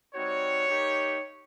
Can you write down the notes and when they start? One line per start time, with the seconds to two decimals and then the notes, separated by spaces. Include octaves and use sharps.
0.14 G3 C4 D#4 F#4 C#5
0.67 A#3 D#4 G4